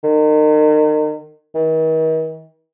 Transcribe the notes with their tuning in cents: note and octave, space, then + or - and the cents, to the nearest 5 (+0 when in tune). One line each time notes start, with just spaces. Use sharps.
D#3 -35
D#3 +45